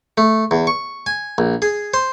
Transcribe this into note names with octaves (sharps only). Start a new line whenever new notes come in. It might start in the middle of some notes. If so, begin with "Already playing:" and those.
A3
E2
C#6
G#5
A#1
G#4
C5